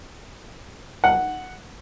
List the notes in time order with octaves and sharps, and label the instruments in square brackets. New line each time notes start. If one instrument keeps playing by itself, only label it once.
[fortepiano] F#5